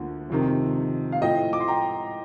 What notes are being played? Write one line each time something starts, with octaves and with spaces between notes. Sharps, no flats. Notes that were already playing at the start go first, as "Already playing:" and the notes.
Already playing: D2 D3 F3 A#3
F2 C3 D#3
F5
A2 F3 A3 D#5 G5
D6
C6
G5 A#5